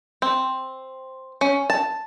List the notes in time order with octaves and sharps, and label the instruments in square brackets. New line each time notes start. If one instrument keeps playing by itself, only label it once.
[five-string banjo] C4
C#4
A5